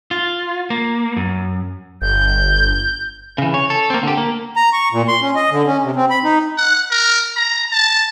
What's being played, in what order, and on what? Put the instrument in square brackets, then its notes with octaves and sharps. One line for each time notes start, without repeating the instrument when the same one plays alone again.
[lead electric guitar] F4
A#3
F#2
[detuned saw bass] G1 [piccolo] G6
[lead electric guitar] C#3 E3
C#5
A4
A#3 C4
D3 G4
A#3
[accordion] A#5
C#6
A#2
C6
C#4
D#5
D3
C#4
C3
C4
B5
D#4
[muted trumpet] F#5
A#4
A#5
A5